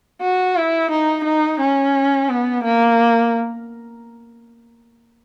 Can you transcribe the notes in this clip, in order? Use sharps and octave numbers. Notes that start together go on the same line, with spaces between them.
F#4
E4
D#4
D#4
C#4
B3
A#3